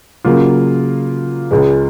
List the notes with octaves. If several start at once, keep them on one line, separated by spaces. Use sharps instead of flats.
C#3 F#3 A#3 F4
C#2 C#3 G#3